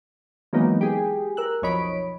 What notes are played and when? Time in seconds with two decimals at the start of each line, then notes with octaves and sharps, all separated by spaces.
0.53 E3 F#3 G#3 A#3 B3 D#4
0.81 G4 G#4
1.37 A#4 E6 F#6
1.62 B1 F2 C#5 D#5 B5 D7